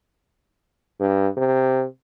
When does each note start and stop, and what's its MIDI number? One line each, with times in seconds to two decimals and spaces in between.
1.00 1.28 43
1.37 1.85 48